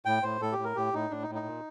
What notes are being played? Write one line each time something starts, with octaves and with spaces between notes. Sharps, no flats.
A2 G5
A2 C5
A2 A4
G4
A2
A#4
A2 G4
A2 D#4
A2 D4
D#4
A2
D#4
A#2